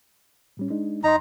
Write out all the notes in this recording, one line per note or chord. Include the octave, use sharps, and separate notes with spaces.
A2 G3 C#4
G#3 D4 D#4
F2 D#4 A#5 C6